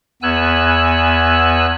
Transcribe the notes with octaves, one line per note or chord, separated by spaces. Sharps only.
E2 B3 G#5 E6 F#6